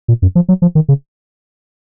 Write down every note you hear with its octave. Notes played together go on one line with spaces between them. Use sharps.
A#2
F#2
F3
F#3
F3
D#3
C#3